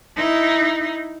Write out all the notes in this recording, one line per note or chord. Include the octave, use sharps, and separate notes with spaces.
D#4 E4